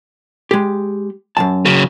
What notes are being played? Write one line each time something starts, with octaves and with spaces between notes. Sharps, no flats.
G#3 G4
F#2 E3 A5
C#3 F#3